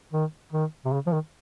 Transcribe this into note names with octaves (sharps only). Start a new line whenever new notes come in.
D#3
D#3
C3
C#3
F3
D#3